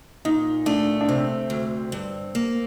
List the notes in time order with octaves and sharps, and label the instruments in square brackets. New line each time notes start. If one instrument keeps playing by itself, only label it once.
[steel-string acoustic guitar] A#2 [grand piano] D#4
[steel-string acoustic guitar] A3 [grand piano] D4
[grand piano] D4
[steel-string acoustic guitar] C3 [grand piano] C4
[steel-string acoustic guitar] D2
G2
A#3